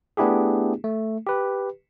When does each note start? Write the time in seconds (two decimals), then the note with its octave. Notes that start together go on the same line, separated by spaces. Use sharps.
0.17 A3 B3 D4 E4 G4 G#4
0.84 A3
1.27 G4 B4